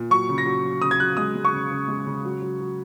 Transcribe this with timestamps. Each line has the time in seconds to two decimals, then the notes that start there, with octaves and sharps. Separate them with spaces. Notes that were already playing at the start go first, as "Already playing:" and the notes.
Already playing: A#2
0.10 F#3 C#6
0.29 C#3
0.38 A#6
0.46 F#3
0.63 F#3
0.82 C#3 D#6
0.91 G#6
1.00 F#3 F#6
1.17 G#3 D#6
1.36 G#3
1.45 C#6
1.53 C#3
1.71 C#3
1.88 G#3
2.07 C#3
2.25 F#3
2.42 F#3
2.60 F#3